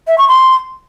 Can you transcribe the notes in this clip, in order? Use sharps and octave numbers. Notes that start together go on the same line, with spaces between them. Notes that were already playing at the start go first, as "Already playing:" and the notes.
E5
C#6
C6